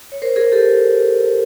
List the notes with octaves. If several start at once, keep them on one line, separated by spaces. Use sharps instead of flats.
C#5
A#4 C5
G#4 A#4
G4 A4